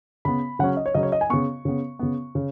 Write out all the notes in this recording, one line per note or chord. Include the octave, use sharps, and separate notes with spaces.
C#3 B3 B5
C#3 F#3 C#4 F#5
D#5
C#5
C#3 F#3 C#4 D#5
C#5
D#5
G#5
C#3 B3 C#6
C#3 B3
C#3 B3
C#3